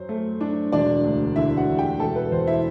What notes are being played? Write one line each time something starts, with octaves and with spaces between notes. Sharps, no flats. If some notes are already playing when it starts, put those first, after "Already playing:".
Already playing: F#2 F#3 C5
A3
D4
E1 D4 D5
D2
D3 E4 E5
F#4 F#5
E1
G4 G5
E1 A4 A5
B4
E2 C5
E4 E5